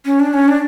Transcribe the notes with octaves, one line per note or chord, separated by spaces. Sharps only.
C#4
D4
C#4
D4